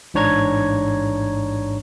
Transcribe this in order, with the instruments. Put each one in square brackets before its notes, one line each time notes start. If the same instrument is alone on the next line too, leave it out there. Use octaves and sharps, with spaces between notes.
[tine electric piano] A1 G#2 D4 C#5 A#5 G#6